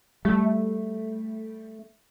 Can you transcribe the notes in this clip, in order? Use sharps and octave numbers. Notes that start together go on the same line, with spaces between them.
G3 A3